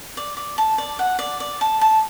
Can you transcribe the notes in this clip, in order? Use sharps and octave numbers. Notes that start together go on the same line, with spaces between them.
D5
D5
A5
D5
F#5
D5
D5
A5
A5